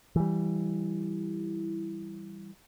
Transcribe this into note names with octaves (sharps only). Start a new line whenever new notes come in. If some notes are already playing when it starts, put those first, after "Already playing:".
E3 G3